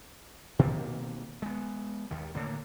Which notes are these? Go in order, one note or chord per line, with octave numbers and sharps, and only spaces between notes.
B2 D#3 A#3 C4
G#3 B3
D#2 D#3
A2 D3 A#3